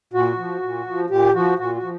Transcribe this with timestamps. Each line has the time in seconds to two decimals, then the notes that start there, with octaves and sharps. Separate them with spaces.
0.13 A#2 F#4
0.38 F3
0.63 A#2
0.86 F3
1.10 A#2 G4
1.35 F3 F#4
1.58 A#2 F#4
1.75 F#4
1.83 F3